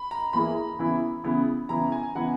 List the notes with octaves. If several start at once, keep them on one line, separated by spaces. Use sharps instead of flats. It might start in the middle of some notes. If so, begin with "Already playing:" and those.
Already playing: B5
A#5
E3 A#3 E4 G#4 B5
C#3 E3 B3 E4
C#3 E3 B3 E4
C#3 E3 B3 E4 A#5
G#5
C#3 E3 B3 E4 F#5